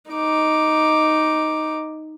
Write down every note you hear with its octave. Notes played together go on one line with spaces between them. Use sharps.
D#4 D6